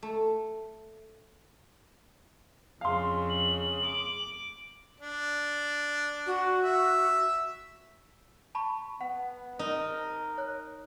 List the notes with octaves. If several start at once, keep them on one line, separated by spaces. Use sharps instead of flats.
A3
F2 C#3 F5 C6
F#7
D6
D4
F#4
E5
A5 B5 C#6
B3 F#5
D#4 A#4
C#5 F#6